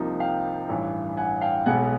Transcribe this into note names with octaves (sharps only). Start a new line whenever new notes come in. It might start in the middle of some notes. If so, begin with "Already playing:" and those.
Already playing: C2 C3 F3 A#3 D#4
F5 G5
A1 G2 E3
F#5 G#5
F5 G5
B1 B2 G#3 B3 F#5 G#5